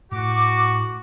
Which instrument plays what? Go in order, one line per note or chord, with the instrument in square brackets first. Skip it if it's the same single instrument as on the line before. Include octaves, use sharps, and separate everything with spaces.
[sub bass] A2 [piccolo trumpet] F#4 [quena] D6